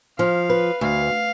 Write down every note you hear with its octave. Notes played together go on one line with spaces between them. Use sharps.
F3 F5
B4
D2 F5